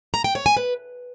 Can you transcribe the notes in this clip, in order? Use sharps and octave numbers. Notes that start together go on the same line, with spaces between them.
A#5
G5
C#5
G#5
B4